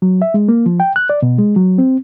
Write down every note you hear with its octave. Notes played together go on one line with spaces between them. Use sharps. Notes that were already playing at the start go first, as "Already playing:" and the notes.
F#3
E5
G#3
A#3
F3
G5
F#6
D5
B2
G#3
F#3
C4